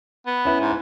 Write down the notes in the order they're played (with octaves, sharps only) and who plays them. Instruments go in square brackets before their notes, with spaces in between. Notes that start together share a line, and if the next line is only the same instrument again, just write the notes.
[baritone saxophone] B3
[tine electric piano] C#4 E4 B4
[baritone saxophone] G#2